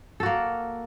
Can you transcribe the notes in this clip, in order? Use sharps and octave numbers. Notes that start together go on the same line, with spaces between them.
A#3 F#4 A4